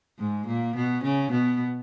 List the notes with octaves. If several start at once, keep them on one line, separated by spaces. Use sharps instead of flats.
G#2 G#3
A#2 A#3
B2 B3
C#3 C#4
B2 B3